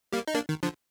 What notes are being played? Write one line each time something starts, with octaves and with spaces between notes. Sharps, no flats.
G3 A#3
D#4
A#3 D4
D#3
D3 F3